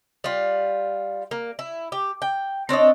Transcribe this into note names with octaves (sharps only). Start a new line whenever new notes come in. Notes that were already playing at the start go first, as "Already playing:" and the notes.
G3 F4
A#3
E4
G4
G5
C4 D4 C#5 D#5